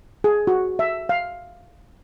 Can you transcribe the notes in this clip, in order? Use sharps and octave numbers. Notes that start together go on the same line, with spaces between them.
G#4
F#4
E5
F5